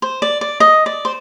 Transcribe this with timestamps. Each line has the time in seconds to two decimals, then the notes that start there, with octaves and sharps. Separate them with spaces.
0.02 C5
0.22 D5
0.41 D5
0.60 D#5
0.86 D5
1.05 C5